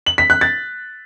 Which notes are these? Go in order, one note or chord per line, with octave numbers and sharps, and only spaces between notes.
F#7
B6
F#6
A6